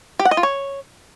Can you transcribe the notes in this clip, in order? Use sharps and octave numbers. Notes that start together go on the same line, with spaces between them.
G4
F#5
D#5
F4
C#5